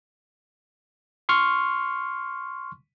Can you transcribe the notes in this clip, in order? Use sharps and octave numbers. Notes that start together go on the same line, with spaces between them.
C6 C#6 F6